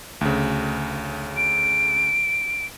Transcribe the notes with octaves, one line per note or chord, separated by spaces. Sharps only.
D2 C#3
D7